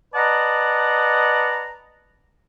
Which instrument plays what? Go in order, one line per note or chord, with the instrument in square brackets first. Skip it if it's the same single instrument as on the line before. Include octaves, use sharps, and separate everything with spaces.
[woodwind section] B4 D5 D#5 F#5 A5 A#5